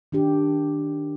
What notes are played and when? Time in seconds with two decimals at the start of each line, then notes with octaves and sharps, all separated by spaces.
0.12 D#3 D4 G4